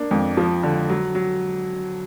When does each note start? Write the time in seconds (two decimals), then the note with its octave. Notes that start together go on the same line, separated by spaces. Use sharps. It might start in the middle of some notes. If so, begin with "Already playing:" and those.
Already playing: A#3 D4
0.11 F2
0.37 F3
0.63 D3
0.89 F#3
1.15 F#3